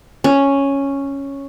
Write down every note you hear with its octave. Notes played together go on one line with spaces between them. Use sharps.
C#4